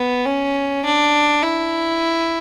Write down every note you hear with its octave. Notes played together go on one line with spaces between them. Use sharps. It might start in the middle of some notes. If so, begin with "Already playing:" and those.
Already playing: B3
C#4
D4
E4